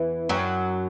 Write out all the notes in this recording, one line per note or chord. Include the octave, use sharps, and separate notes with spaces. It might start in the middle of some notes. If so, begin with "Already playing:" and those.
Already playing: E2 E3
F#2 F#3